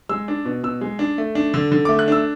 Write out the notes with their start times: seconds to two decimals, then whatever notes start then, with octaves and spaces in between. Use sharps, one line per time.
0.09 G#3 E6
0.28 D4
0.45 B2
0.64 B2 E6
0.81 G#3
0.99 D4
1.18 A3
1.35 D4
1.54 D3
1.72 D3
1.85 A3 D6
1.99 F#6
2.08 D4 E6